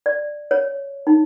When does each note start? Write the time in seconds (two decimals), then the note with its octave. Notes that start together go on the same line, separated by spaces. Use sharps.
0.06 D5
0.51 C#5
1.07 D#4